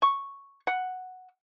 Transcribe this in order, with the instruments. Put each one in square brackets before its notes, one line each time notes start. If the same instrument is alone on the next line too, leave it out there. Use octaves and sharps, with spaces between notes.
[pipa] C#6
F#5